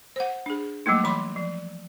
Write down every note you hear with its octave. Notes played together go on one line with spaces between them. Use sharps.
C5 F#5
D4 G#4
F#3 G3 A3 A#3 D#4
E3 B5 C6
F3